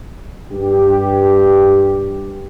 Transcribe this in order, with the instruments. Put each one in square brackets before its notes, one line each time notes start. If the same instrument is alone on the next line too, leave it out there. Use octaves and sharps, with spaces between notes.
[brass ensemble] G2 G4